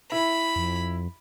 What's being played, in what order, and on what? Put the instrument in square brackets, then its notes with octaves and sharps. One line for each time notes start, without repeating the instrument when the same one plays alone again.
[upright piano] E4 [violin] B5
[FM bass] F2